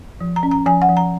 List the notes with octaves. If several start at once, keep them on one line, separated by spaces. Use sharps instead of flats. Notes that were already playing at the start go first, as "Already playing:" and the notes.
F3
A#5
C#4
A#5
F3 G#5
F#5
F3
A#5